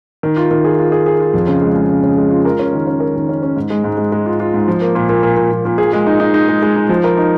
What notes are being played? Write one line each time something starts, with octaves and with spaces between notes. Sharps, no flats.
D#3
F4
D#3
G#4
F4
G#4
G#4
F4
F2
C#3
G#3
G#3
C#3
C#3
G#3
F4
A#4
C#4
D#3
C#4
A#4
D#3
C#4
C#4
G#2
G#3
G#2
G#3
G#3
F4
F4
G#2
F3
A#3
A#2
A#2
A#2
A#2
A#2
A#2
G#4
G#3
D#4
D#4
D#4
G#3
G#3
D#4
F3
A#4
D#4